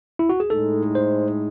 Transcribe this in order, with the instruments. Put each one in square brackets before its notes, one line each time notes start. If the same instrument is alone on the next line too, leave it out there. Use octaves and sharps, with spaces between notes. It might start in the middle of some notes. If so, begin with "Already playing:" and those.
[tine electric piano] E4
F#4
G#4
[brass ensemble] A2 G#3 D#4 [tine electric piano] A4
[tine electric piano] C5